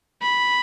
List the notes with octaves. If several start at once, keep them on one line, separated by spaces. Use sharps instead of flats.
B5